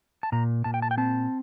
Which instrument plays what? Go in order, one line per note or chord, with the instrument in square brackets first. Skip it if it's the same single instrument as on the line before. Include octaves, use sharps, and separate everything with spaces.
[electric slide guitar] A5
A#2 A#5
A#2 A5
G5
A5
G5
C4 A5